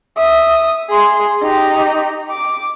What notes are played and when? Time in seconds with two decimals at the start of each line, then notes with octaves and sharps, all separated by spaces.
0.17 E5 D#6
0.90 G#4 C6
1.43 D#4 G4
2.31 D6